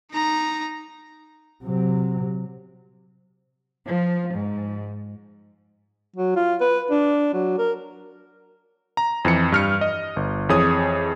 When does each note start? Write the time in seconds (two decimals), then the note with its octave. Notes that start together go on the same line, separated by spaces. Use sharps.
0.12 D#4 A#5
1.64 C3 F#3
3.88 F3
4.34 G#2
6.16 F#3
6.36 F4
6.61 B4
6.91 D4
7.34 F#3
7.58 A#4
8.97 A#5
9.25 F2 E3 C#7
9.52 G2 F6 C#7
9.81 D#5
10.16 G1
10.49 F2 E3 G#4 C#5 D#6